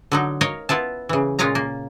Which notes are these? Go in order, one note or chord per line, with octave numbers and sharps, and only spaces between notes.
D3 F#3 D#4
A#4 C#5 D#5 F5
B3 E4 F4 A5
C#3 E3
A#2 G#3 C#4 F4 F5 A#5
A#3